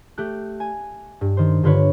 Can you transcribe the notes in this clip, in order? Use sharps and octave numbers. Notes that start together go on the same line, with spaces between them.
A3 G4 F#6
G#5
G2
D#3 C5
G2 D3 F4 B4 C#5